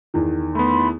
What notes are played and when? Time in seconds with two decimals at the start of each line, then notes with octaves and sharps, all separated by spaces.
0.14 E2 D#3
0.55 A3 B3 B5 C6